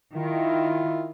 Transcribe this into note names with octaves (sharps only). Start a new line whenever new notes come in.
D#3 E4 F4